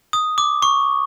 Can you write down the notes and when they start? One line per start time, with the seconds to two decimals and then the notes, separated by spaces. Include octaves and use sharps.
0.13 D#6
0.38 D6
0.62 C#6